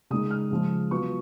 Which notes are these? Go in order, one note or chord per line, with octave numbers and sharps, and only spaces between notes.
C#3 G#3 D#4 D#6
F6
C#3 F3 G#3
F#3 B3 F4 C#6